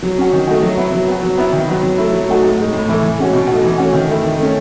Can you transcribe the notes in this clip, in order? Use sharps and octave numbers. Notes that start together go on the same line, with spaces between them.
F#3
C#4 F#4
D#3
A3 D#4 F#4
F#3
B3 E4
F#3
B3 F#4
F#3
B3 E4
D#3
F#3 B3
F#3
A3 E4
F#3
A3 D#4 F#4
A2
G#3 D#4
A2
E3 A3 E4
E3
G#3 C#4 F#4
B2
A3 D#4 F#4
E3
A3 C#4 F#4
D#3
A3 E4
D#3
A3 C#4